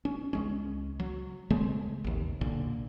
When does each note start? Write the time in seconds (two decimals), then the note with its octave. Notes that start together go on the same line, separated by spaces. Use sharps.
0.05 C#4
0.33 C#2 G#3 C#4
1.00 F#3
1.50 C#3 G#3 A3 C4
2.04 A1 D#2
2.41 B1 A#2 D3